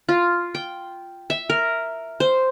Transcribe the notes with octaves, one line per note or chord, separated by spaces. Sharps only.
F4
G5
E5
A#4
C5